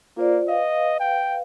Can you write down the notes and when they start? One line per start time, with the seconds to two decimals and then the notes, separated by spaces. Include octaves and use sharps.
0.17 A#3 F4 C5 D5
0.48 B4 D#5 F5
1.00 G5